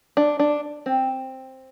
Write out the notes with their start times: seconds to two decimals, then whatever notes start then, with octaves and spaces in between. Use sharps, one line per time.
0.17 D4
0.39 D4
0.86 C4